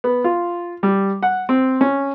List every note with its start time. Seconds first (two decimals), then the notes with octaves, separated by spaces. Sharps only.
0.04 B3
0.24 F4
0.83 G3
1.23 F#5
1.49 C4
1.81 C#4